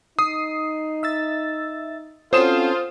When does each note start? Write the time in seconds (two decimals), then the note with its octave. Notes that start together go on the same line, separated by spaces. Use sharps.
0.19 D#4 D#6 C7
1.03 E5 E6 A6
2.33 C4 C#4 F4 F#4 A4 C5 D#6 E7